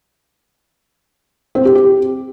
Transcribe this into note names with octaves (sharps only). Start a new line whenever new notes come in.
C4
G4
G4